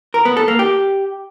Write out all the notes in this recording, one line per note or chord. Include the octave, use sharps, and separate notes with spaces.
A#4
B3
A4
A#3
G4